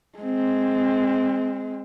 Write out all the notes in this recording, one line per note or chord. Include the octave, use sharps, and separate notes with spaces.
G#3 C4